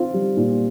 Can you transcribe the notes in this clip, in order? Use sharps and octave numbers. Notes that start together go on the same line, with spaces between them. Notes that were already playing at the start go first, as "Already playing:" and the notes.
Already playing: C4 F4
G3
A#2